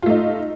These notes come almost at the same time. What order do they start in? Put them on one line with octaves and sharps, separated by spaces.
F4 A3 D#4